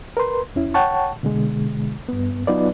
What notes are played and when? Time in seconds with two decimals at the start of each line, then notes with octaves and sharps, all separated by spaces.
0.17 A#4 B4 C6
0.55 E2 C#4 E4
0.74 C#5 F#5 G5 A5 C#6
1.23 B2 D3 G#3
2.09 G2 B3
2.47 F#3 B3 D#4 F4 B4 D5